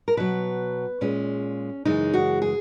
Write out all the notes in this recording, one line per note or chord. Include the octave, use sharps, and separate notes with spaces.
A#4
B2 F#3 B4
A#2 G#3 C#4
F#2 C#3 E3 G#3 D#4
F#4
G#4